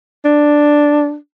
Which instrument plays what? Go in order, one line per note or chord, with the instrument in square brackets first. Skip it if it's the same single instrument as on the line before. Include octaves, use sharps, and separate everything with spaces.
[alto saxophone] D4